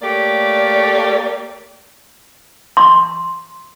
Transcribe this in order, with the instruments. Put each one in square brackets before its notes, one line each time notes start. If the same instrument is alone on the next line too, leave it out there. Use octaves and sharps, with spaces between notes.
[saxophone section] A3 A#3 G4 C#5 D5
[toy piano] C6